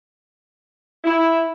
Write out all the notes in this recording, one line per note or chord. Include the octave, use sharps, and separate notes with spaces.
E4